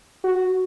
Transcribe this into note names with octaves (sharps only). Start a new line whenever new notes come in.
F#4